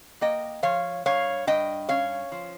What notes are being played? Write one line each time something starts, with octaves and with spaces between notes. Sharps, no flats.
A#3 D#5 G5
F3 C#5 F5
G2 C#5 F5
G2 D#5 G5
C#4 C#5 F5
F3